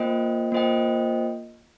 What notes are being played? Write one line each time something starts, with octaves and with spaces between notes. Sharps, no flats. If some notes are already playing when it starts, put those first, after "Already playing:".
Already playing: A#3 F4 C5 D#5 G5
A#3 F4 C5 D#5 G5